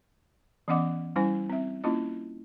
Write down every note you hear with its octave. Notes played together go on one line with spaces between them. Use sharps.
E3 B3 C#4 D#5 F#5 D6
G3 C#4 E4 C5 G#5
C4 E5
A#3 C#4 E4 F4 D#5